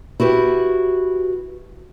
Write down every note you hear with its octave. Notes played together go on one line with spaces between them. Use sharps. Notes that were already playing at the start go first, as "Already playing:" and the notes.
E4 F#4 G4 B4